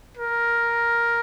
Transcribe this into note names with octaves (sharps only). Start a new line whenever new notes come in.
A#4